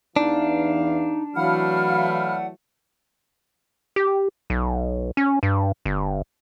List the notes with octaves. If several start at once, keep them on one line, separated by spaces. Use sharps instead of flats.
E2 E3 D4 D#4 F5
E3 F#3 A3 F5 F#5 B5 F6
G4
B1
C#4
G2
G1